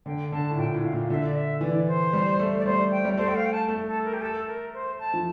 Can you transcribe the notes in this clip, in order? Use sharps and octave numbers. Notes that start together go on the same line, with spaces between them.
D3 G5
D3 A5
A2
A#2 G5
A2
F5
A#2
D3 E5
D5
E5
E3 D5
C5
G3
A3
D5
G3 C5
G5
G3
A3 C5
G5
F5
G5
A5
A3
A4
A#4
G4
A4
A#4
C5
A5
F3